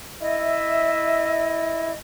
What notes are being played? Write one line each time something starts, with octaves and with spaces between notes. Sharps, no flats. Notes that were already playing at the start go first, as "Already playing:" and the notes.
E4 D#5 E5